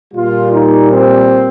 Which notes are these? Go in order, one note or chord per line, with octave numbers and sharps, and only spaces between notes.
A#2 G3 A#3 F4
D#4
C4